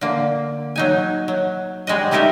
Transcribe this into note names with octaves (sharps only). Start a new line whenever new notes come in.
D3 A#3
F#3 D#4 G#5
F#3
G3 G#3 F#4 D#5
G3 A3 D#4 G4 A#4 E5